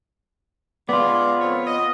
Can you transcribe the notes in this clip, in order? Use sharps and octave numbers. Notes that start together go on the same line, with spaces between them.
G#3 B3 F4 G#4 D5
F2 C4 C#5
D#5